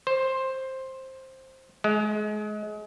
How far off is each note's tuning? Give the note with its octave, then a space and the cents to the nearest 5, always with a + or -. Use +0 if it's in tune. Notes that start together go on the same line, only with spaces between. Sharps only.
C5 +10
G#3 +30